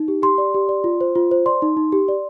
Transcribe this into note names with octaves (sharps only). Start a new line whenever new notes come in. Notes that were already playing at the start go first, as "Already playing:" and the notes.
Already playing: D#4
G4
G4 C6
D5
G4
D5
F4
C5
F4
C5
D5 C6
D#4
D#4
G4
D5